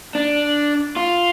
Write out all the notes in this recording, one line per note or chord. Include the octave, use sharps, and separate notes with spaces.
D4
F4